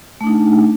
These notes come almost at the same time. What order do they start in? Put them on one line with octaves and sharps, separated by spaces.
A3 D4 D#4